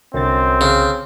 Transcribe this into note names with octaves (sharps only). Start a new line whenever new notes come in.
C2 F#2 D3 C4 A6
C#3